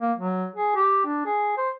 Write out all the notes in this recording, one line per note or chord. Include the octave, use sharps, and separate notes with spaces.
A#3
F#3
G#4
G4
D4
G#4
C5